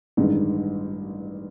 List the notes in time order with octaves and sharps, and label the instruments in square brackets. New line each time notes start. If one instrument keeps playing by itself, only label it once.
[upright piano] A1 G2 D#3 G#3